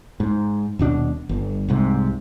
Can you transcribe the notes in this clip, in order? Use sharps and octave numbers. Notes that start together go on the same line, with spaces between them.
G#2
D#1 B2 D4
G1
C2 G#2 C3